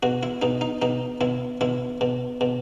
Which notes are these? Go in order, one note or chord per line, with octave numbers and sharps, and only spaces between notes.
B2 F#4
E4
B2 D#4
D#4
B2 D#4
B2 E4
B2 E4
B2
B2